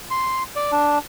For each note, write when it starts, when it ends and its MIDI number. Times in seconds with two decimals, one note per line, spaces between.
0.11 0.43 84
0.56 0.72 74
0.72 0.99 62